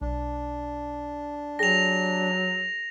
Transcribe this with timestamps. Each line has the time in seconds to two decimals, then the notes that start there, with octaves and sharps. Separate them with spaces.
0.01 B1 D4
1.59 F#3 G4 G#4 A#6 F7